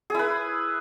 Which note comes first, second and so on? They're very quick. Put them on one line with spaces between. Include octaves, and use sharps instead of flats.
G#4 E4 B4